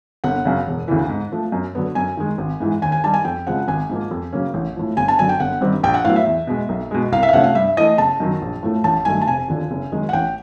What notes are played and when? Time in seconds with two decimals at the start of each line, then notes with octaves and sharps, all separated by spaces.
0.24 G1 F#5
0.45 F#2 C#3
0.67 E1
0.88 D2 C#3 E3
1.09 G#2
1.32 F3 A3
1.52 F#2
1.75 D3 F#3 B3
1.95 F#2 G#5
2.17 D#3 G#3
2.38 G#1
2.60 G#2 E3 G#3
2.82 D#2 G#5
2.92 G#5
3.04 D#3 G3 A5
3.14 G#5
3.25 F2 G5
3.47 C#3 F3 G#3 C4 F#5
3.68 G#1 G#5
3.90 G#2 F3 A#3
4.11 F2
4.32 C#3 F#3 A#3 C#4
4.54 A1
4.76 A2 F3
4.97 G1 G#5
5.08 A5
5.19 F#2 D3 F#3 G#5
5.29 G5
5.40 G1 F#5
5.61 G2 D#3 G3 C4
5.83 A#1 G5
5.94 F#5
6.05 A2 F#3 B3 F5
6.16 E5
6.26 E2
6.47 B2 G#3
6.69 B1
6.91 B2 G#3
7.12 C2 F5
7.23 E5
7.29 F5
7.33 C3 F3 A3 C#4 F#5
7.44 F5
7.55 G2 E5
7.77 E3 A3 D#5
7.98 F#1 A5
8.20 F#2 D#3 F#3
8.42 A#1
8.63 A2 F3 A3
8.84 A1 A5
9.05 G2 D#3 F#3 A3 G#5
9.22 A5
9.27 F1 G#5
9.48 D#2 D3 F3
9.71 F#1
9.92 F#2 D#3 G#3
10.09 F#5
10.13 A1 G5